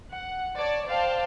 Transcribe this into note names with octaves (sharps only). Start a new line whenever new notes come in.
F#5
C#5 D5 A5
C5 D5 F5 G5 A5